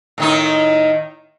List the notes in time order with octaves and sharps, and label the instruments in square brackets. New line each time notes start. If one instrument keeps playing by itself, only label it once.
[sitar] A2 D#3 D#4